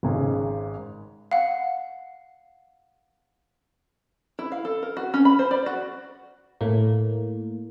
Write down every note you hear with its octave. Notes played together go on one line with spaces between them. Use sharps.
G#1 G#2 C#3
F5 F#5
E4
F5
A4
A#4
F#4
C#4
B5
C5
D5
F#4
A2 A#3